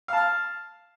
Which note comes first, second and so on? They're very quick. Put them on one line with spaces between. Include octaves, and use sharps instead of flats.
F5 A5 F6